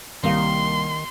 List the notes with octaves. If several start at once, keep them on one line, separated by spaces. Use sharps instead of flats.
C2 D#3 A#3 F5 C6